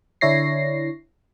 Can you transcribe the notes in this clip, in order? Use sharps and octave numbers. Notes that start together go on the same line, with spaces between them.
D3 D4 E4 C#5 A#6 C7